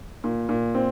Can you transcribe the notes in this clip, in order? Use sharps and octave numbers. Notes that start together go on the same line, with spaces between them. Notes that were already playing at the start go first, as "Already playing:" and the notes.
A#2
A#2
C4